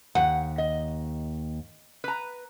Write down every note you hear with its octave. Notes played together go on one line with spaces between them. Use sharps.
D#2 F#5
D#5
B4 A#5